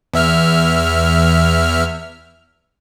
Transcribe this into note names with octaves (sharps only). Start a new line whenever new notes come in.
E2 E5 F6